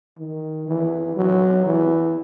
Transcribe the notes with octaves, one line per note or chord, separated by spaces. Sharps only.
D#3
E3
F#3
E3